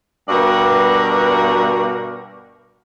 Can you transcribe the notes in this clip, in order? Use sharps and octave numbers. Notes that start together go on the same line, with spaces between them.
G2 B2 F#4 A#4 B4 D5